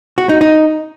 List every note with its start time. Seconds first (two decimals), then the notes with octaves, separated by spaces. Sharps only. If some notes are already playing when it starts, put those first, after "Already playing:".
0.18 F#4
0.29 D#4
0.41 D#4